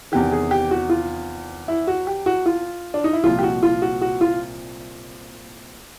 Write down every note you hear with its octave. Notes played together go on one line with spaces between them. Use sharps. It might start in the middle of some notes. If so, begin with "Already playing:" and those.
E2 C3 D#3 G4
G#4
G4
F#4
F4
E4
F#4
G4
F#4
F4
D4
D#4
E4
C2 A#2 F3 F4
G4
F#4
F4
F#4
F#4
F4